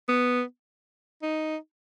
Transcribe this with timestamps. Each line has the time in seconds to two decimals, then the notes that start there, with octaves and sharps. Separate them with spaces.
0.08 B3
1.22 D#4